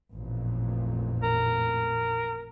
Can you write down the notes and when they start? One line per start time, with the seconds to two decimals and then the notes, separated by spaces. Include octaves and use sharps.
0.13 A1 F2 A#2
1.23 A#4